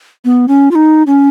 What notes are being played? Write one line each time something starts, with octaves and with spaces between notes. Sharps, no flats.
B3
C#4
F4
D#4
C#4